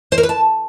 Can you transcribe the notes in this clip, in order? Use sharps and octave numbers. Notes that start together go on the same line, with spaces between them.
C5
A#4
B4
A5